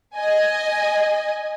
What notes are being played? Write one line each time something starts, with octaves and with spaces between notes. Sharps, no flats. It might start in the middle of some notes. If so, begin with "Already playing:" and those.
D#5 G#5